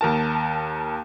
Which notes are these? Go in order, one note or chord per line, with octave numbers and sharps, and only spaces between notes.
D#2 A#4 A5